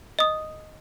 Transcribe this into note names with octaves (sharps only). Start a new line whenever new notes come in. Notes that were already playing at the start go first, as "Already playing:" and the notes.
D#5 D#6